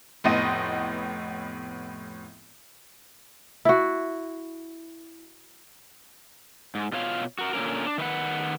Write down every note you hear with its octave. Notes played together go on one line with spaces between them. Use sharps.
F1 A2 B3 D#5 C6 D#7
E4 F#4
G#2
B2 F4 C#5 F5
F#4 A#4
A#2 D3 A#3 C#4 A#4
D4
D#3 B4 E5 F#5